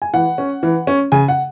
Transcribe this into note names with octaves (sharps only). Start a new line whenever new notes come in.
G#5
E3 F#5
C#4
E3
C#4
C#3 G#5
F#5